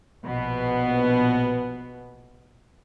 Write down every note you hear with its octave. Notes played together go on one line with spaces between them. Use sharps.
A#1 B2 B3